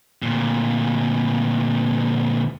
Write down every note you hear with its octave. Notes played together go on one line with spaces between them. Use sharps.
D2 A#2